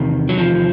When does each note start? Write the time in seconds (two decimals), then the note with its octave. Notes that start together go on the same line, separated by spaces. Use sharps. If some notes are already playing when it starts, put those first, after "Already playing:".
Already playing: E2 C3 D#3
0.29 F#3
0.38 F3